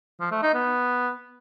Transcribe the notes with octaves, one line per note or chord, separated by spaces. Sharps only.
F3
A3
D#4
B3